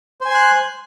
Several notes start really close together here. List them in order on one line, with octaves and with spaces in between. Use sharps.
C5 G#5 C6 F#6